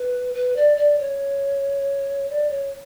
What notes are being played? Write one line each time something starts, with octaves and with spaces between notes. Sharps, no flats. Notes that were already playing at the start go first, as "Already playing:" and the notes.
Already playing: B4
B4
D5
D5
C#5
D5
C#5